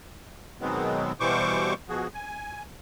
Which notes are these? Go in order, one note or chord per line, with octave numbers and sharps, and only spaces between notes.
B2 D#3 F#3 G#3 B3 C4
B2 E3 G3 C5 C#6 D6
B2 F3 F#4 G#4
G#5